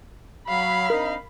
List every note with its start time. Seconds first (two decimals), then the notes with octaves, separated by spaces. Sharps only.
0.49 F#3 F5 B5
0.90 C4 D4 D#4 A#4